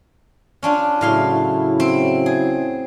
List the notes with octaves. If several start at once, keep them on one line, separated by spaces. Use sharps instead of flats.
C#4 D4 F4
A2 C#3 F#3 E4 F5 C6
C4
G#4